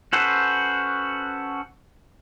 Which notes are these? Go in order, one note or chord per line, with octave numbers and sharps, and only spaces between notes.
C#4 F#4 A4 B4 C5